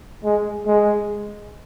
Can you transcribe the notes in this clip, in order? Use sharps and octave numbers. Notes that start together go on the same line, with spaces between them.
G#3
G#3